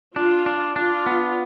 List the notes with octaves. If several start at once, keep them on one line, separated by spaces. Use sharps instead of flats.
D4 F4
D4
D4 F4
B3